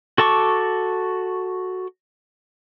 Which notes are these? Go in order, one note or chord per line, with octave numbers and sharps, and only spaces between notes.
F#4 A4 A5 C#6 D6